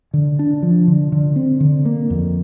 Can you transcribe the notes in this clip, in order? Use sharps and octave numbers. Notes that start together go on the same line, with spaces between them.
D3
D4
F3
D3
D3
C4
D3
A#3
F2